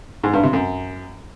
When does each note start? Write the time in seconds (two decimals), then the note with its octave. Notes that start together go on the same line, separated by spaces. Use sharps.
0.23 G#2
0.33 G2
0.43 C3
0.53 F#2